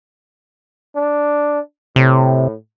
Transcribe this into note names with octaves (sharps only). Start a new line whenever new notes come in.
D4
A2 C3